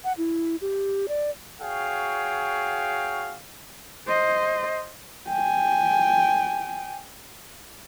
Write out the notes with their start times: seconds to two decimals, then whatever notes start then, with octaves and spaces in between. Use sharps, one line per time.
0.04 F#5
0.18 E4
0.61 G4
1.09 D5
1.61 F#4 G#4 C#5 F5 G5
4.07 C5 D#5
5.29 G5 G#5